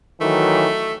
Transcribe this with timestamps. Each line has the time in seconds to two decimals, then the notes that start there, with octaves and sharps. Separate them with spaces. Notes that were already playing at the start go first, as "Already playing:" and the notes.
0.21 D#3 E3 F#3 A3